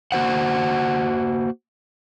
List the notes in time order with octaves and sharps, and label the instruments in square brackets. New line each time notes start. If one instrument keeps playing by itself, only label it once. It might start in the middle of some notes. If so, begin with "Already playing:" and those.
[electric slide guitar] A#3 F#4 C5 F#5